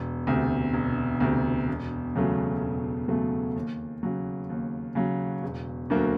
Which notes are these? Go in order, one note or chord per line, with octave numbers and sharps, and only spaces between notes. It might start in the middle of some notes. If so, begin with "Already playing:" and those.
Already playing: E1
D2 C3
E1
D2 C3
E1
E2 C#3 F#3 A3
E1
E2 C#3 F#3 A3
D#2
C#3 F#3
D#2
C#3 F#3
E1
D2 D3 F#3 A#3